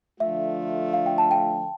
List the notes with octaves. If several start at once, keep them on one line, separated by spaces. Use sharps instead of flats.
D3 F3 A3 D4 F4 E5
F5
G5
A5
G5